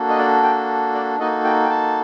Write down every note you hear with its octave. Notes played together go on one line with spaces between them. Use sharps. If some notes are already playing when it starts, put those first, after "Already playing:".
Already playing: A#3 D4 F#4 A4
D#5
D5
G5
D5
A#3 D#4 F#4 A4 D#5
G5
G5
A5